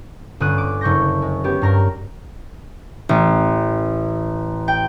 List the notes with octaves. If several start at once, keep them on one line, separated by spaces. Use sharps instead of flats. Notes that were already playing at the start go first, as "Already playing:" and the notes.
G1 C#4 D#6 F#6 D#7
D6
F#1 C#6 G6 A#6
G#3
B3 C#4 G4
G2 A#4 A#5
A1
G5